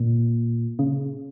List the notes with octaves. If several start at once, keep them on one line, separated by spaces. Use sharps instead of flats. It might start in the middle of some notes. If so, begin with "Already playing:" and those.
Already playing: A#2
C#3